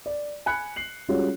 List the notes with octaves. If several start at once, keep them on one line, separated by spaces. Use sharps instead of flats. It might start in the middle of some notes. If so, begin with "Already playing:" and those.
D5
G#5 B5 F#6 C#7
C7 F#7
G3 G#3 C#4 F4 F#4 C#5